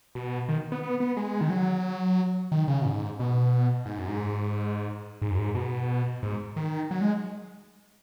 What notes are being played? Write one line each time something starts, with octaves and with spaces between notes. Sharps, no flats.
B2
D#3
B3
B3
B3
G#3
D#3
F#3
D#3
C#3
B2
G#2
B2
G#2
F#2
G#2
G#2
F#2
G#2
B2
G#2
D#3
F#3
G#3